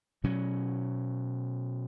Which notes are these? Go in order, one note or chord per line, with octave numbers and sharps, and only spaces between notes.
B2 F#3 C#4